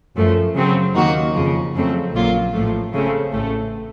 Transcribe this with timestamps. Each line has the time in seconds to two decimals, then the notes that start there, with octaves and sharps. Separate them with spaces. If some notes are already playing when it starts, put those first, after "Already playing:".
0.16 F#2 F3 A3
0.55 C#3 F#3 C4
0.95 D#2 D#3 A#3 D#4 F#4
1.34 F2 C#3 F3
1.75 F2 C#3 F#3 A3 C4
2.13 A#1 A#2 F#3 A#3 F4
2.53 A1 A2 F3 A3
2.93 C#3 A3 C4
3.32 A1 A2 A3